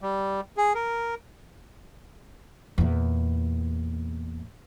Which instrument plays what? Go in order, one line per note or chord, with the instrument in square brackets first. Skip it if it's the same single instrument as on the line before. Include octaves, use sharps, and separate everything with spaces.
[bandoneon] G3
G#4
A#4
[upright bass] E2 A#2